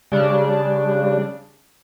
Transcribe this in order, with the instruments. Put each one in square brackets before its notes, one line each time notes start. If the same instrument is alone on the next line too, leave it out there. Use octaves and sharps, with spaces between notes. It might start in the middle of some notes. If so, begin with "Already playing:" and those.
[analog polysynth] C#3 D4 [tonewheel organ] G3